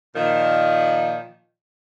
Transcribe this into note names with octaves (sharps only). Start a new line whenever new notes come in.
A#2 D#3 F3